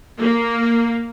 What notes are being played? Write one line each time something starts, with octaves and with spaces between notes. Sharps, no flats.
A#3